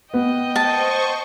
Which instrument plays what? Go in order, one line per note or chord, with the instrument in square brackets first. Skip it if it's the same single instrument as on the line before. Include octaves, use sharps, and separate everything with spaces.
[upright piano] B3 [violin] D#5 G5
[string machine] C5 C#6 [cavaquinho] A5